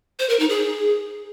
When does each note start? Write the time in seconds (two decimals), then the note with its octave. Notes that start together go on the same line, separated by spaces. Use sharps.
0.19 C5
0.29 A#4
0.40 D#4
0.50 G#4